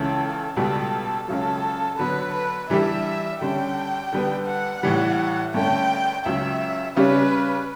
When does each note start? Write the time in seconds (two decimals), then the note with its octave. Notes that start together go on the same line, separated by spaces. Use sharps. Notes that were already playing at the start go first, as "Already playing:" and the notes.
Already playing: C#2 C#3 E3 A4
0.57 C#2 B2 G3 A4
1.28 C#2 C#3 F#3 A4
1.98 D3 F#3 B3 B4
2.34 B4
2.70 E3 G3 D4 G4 E5
3.41 D3 G3 C#4 G5
4.12 D3 G3 B3
4.47 F#5
4.83 A2 E3 G3
5.54 G2 D3 A3 C#4 G5
6.25 C#2 C#3 F#3 E5
6.96 C#3 G3 C#4 G4 B4